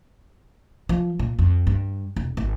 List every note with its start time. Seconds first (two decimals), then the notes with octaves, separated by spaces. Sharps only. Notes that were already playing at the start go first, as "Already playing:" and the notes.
0.89 F3
1.19 A#2
1.39 F2
1.67 G2
2.16 E1
2.37 G#1